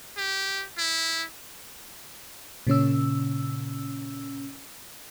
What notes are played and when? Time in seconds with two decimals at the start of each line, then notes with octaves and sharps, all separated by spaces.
0.17 G4
0.78 E4
2.67 A#2 C#3 C#4 E6